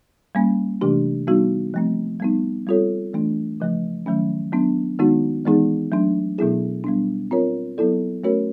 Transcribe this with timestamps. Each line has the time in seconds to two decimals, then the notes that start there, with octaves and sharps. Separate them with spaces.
0.35 G3 A#3 C#4
0.81 C3 E3 A3 D4 G4
1.27 G3 B3 D#4 F#4
1.74 F3 A3 C4
2.20 G3 B3 D#4
2.67 G3 C4 F4 A4 C#5
3.13 E3 A3 D4
3.60 C#3 F3 A3
4.06 D#3 F#3 A3 C#4
4.53 F#3 B3 D4
4.99 D#3 G#3 B3 D#4 F#4
5.45 E3 G#3 B3 D#4 G#4
5.92 F#3 A3 D4
6.38 B2 F#3 B3 E4 G#4
6.84 G3 B3 D4
7.31 C4 F4 A#4 C#5
7.78 F#3 B3 E4 A4 D5
8.24 A3 C#4 F#4 A#4 C#5